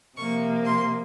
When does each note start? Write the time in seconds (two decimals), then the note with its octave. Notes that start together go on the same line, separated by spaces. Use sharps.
0.17 C3 F3 A#3 C#6
0.65 C6